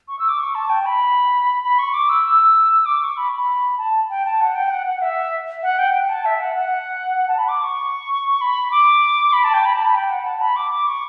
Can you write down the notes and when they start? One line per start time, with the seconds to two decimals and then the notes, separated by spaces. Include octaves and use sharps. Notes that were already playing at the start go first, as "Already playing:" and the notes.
0.08 C#6
0.19 E6
0.29 D6
0.39 C#6
0.55 A5
0.70 G5
0.86 B5
1.63 B5
1.79 C#6
1.94 D6
2.09 E6
2.25 E6
2.85 D6
3.02 C#6
3.17 B5
3.37 B5
3.78 A5
4.10 G5
4.25 A5
4.41 F#5
4.55 G5
4.70 F#5
4.87 F#5
5.02 E5
5.63 F#5
5.79 G5
5.94 G5
6.09 A5
6.25 E5
6.40 F#5
6.56 F#5
7.18 F#5
7.28 A5
7.38 B5
7.48 D6
7.63 C#6
8.41 B5
8.71 D6
9.33 B5
9.44 A5
9.54 G5
9.65 B5
9.74 A5
9.85 B5
9.95 G5
10.10 F#5
10.26 A5
10.41 B5
10.56 D6
10.71 D6
10.87 C#6